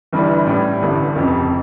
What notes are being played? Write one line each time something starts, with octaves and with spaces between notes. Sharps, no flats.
G1 G2 E3 G3
A2 G3 C#4
A1 G2 D3
F1 F2 C#3